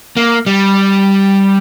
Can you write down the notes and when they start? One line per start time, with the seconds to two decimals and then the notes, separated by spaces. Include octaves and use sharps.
0.17 A#3
0.46 G3